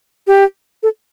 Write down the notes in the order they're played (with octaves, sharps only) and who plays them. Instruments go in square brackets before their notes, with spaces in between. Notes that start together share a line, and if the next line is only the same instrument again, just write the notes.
[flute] G4
A4